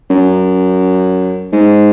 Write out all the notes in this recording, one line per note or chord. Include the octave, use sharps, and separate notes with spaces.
F#2
G#2